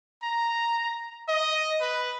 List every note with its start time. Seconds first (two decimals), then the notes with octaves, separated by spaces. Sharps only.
0.23 A#5
1.28 D#5
1.81 B4